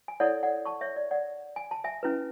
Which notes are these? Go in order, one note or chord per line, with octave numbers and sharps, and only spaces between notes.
G#5
E4 A4 C#5 D5 F#5
D5 F#5
A5 C#6
C#5 E5
D5
D5 F#5
G#5
A5
E5 G#5
C#4 E4 B4